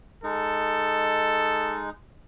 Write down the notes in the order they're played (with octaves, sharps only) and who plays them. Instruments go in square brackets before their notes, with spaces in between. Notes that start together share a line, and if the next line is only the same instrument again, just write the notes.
[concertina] G#3 D#4 [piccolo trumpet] A4